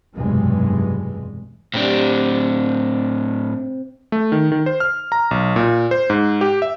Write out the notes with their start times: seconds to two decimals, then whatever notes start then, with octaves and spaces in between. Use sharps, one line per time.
0.15 F1 B1 G2 E3 G#3
1.74 A2 C3 D4
4.12 A3
4.32 D#3
4.52 D#3
4.66 C5
4.80 F6
5.12 A#5
5.31 B1
5.56 A#2
5.91 C5
6.10 G#2
6.41 G4
6.62 E5